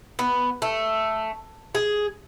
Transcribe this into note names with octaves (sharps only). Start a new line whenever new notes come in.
B3
A3
G#4